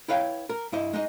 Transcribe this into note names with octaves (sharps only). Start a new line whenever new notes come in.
E4 B4 C#5 F5 G5
A#4
G2 E4 D#5
G#3 D#4 D#5